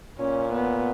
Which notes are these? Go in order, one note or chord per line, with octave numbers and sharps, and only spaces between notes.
A#2 C#4
B3